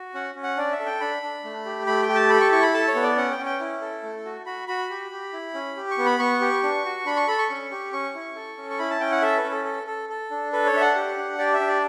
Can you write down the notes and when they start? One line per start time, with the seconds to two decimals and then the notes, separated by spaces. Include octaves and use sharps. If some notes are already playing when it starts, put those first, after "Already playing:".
Already playing: F#4
0.14 C#4 F#5
0.35 C#4
0.43 F#5
0.57 D4 D5
0.72 E5
0.80 A4
0.86 G5
1.00 D4 B5
1.23 D4
1.44 A3
1.66 G4
1.86 A3 B5
2.02 G5
2.09 G4
2.16 A5
2.30 A4 B5
2.41 C#6
2.52 E4 C#6
2.62 B5
2.74 A4 A5
2.88 C#5
2.95 B3
3.02 D5
3.17 C#4 F#5
3.31 G5
3.38 C#4
3.46 G5
3.60 E4
3.81 A4
4.03 A3
4.25 F#4
4.46 F#4 B5
4.68 F#4 B5
4.90 G4
5.12 G4
5.33 E4
5.54 C#4
5.77 G4
5.91 C#6
5.98 B3
6.06 B5
6.19 B3 C#6
6.41 G4
6.63 D4
6.85 F#4
7.05 D4 B5
7.16 C#6
7.27 A4 B5
7.38 C#6
7.50 C#4
7.71 G4
7.93 C#4 C#6
8.15 E4
8.36 A4
8.58 C#4
8.70 C#6
8.79 E4 B5
8.90 A5
9.00 C#4 G5
9.12 F#5
9.22 A4 E5
9.37 B4
9.44 C#4
9.51 A4
9.65 A4
9.87 A4
10.09 A4
10.31 D4
10.52 A4 B4
10.66 C#5
10.73 D4 E5
10.81 F#5
10.95 G4
11.17 D4
11.39 G4 D5
11.53 E5
11.60 D4
11.68 D5